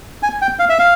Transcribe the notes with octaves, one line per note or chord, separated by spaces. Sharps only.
G#5
G5
F5
E5
F5